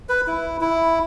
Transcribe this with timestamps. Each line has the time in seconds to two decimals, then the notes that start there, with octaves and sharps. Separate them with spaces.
0.09 B4
0.27 E4
0.61 E4